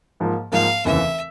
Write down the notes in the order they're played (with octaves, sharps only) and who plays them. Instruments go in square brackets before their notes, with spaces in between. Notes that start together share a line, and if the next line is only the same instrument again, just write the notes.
[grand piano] G#2 F3 A#3
[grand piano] G#2 F3 A#3 [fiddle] F5
[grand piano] F1 D#2 C#3 E3 [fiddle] E5